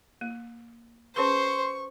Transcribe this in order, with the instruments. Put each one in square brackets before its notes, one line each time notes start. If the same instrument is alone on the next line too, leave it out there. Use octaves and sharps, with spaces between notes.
[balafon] A#3
[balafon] C#4 G#4 B4 [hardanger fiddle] C5 [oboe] C6 [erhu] C#6